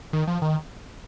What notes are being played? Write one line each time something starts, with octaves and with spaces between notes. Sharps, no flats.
D#3
F3
D#3